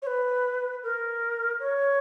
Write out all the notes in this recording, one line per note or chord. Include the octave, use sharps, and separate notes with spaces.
C#5
B4
A#4
C#5